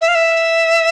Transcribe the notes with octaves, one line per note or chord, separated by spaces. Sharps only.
E5
F5
E5